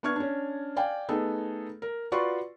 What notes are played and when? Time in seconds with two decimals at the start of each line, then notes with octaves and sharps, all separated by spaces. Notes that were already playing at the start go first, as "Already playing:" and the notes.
0.03 B3 D4 C#6 F6 G#6
0.16 C#4 D4
0.76 D5 F5 G5 G#5
1.09 A3 B3 D#4 G#4 A4
1.82 A#4
2.12 F4 F#4 B4 D5 C6 C#6